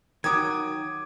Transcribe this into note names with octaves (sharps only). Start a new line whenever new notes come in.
D#3 F#3 D6 D#6 G#6